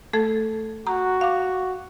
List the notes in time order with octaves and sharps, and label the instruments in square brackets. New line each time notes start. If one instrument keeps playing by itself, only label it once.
[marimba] A3 A4 G#6
[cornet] F#4 [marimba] A#5
[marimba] F5 D6